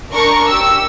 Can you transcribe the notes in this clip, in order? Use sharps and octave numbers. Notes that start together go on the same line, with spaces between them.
D4 A#4 C#6
G4 E6